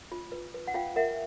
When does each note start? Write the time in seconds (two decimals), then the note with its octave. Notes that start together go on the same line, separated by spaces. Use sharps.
0.12 F4
0.32 B4
0.54 B4
0.67 F#5
0.74 F4 F5 G5
0.96 A#4 E5 F#5